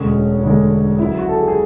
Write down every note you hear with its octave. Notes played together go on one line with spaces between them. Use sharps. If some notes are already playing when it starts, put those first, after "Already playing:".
Already playing: E1 D2 D3 G#3 C#4
E1 D2 D3 G#3
C#2 C#3 F#3 E4
F#4
A4
G#4
G#4